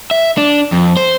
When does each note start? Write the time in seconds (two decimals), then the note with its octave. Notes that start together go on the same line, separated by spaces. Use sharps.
0.11 E5
0.37 D4
0.72 F2
0.97 C5